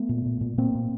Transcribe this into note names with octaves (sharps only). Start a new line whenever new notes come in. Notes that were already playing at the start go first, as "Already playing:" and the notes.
Already playing: A3 B3
A#2
A#2
A#2
A#2 A#3 C4
A#2